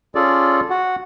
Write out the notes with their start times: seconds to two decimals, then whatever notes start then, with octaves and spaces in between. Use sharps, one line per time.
0.15 C#4 F4 G#4 A4 D5
0.70 F#4 F#5